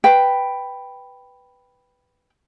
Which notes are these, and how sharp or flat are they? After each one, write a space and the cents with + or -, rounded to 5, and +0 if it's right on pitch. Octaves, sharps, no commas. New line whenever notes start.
B4 +0 G5 +0